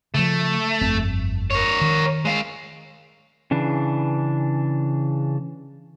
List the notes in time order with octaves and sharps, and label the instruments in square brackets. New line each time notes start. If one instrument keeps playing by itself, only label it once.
[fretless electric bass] C#3 F3 [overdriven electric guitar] A3
[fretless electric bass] G1 F2 C4
[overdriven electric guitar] A#4 C#5
[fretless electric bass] D#3
[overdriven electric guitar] G#3 F5
[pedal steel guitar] C#3 E3 D4